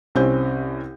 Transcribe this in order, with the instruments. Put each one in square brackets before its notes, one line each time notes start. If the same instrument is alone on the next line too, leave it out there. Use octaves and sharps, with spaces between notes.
[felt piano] C2 C3 C4 C#4 G6